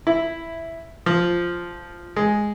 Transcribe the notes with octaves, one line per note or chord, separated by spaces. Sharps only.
E4
F3
G#3